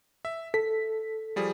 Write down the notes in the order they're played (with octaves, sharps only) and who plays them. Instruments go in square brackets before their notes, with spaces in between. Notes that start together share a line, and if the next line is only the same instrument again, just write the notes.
[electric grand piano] E5
[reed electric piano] A4 [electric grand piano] B6
[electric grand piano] F3 G3 G#4